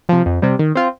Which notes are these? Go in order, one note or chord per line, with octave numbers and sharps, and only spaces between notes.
C3 F3
F2
C3 G3
D#3
C4 F4